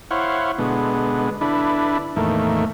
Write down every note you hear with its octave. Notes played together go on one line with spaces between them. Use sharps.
E4 C5 C#5 F5 F#5
B2 D3 G#3 B3
D3 D4 E4 B4
E2 A2 D#3 A3 A#3